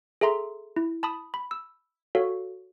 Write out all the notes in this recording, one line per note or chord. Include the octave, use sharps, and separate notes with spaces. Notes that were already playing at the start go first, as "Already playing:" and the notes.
G#4 A4 E5 A#5 C6
E4
A5 B5 D#6
B5
E6
F#4 A4 C#5 F5